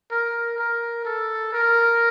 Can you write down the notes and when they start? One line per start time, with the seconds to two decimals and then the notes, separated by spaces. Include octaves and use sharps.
0.11 A#4
0.58 A#4
1.05 A4
1.53 A#4